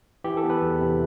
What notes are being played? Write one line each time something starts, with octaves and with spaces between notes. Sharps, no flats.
E3 G4
A4
B3
B4
E2
C3